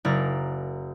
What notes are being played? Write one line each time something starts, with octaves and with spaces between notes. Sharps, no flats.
F#1 E4 A#4 D5 A#6